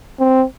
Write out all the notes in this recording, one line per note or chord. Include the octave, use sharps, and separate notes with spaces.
C4